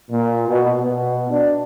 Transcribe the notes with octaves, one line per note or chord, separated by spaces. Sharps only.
A#2
B2
B2
D4